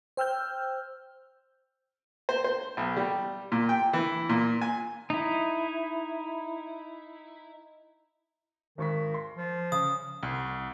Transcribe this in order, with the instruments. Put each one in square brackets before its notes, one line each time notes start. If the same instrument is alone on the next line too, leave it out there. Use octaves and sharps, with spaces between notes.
[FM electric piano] C5 G5 E6 F6 G6
[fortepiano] C5
C5
B1
G3
A#2
G5
E3
A#2
G#5
[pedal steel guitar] D#4 E4
[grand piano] G#1 C#6 B6 [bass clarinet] D#3
[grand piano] C6
[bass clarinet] F3
[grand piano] C#3 [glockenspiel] D#6
[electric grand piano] C2